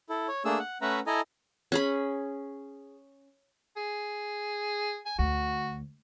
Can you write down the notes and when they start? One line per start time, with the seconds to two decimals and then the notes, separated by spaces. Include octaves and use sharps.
0.10 E4 A4
0.28 C#5
0.45 A3 A#3 D4 G#4 E6
0.59 F#5
0.82 A3 C#4 B4 E5 F#5 A#5
1.07 E4 A4 D#5 G#5 A#5
1.72 C#4 G#4 B5
3.77 G#4
5.06 G#5
5.19 D2 F#4